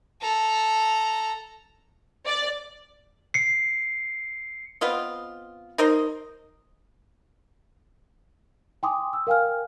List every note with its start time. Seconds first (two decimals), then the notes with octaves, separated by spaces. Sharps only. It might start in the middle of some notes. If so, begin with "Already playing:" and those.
0.21 A4 A#5
2.25 D5
3.34 C7 C#7
4.81 B3 C4 F4 D#5
5.78 D#4 A#4 C5 D#5
8.83 G5 G#5 C6 D6 D#6
9.13 E6
9.27 A#4 F5 G5 G#5 F6